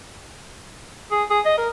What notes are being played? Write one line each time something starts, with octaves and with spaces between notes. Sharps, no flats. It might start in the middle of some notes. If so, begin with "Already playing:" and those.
G#4
G#4
D#5
A#4